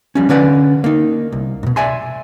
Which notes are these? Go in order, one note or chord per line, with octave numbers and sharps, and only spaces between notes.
F3 G3 C#4
D3 C#4 B4 D5 F#5
A#3 D#4
C2
G#2 B2
D5 E5 G#5 C6